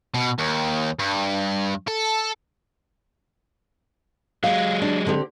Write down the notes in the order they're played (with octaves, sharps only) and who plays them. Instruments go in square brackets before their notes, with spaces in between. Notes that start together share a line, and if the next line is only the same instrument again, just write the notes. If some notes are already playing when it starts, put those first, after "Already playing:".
[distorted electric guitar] B2
D#2
G2
A4
[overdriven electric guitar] F#3 G#3 [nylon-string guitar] F5
[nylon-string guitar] D4
D3 C4 G4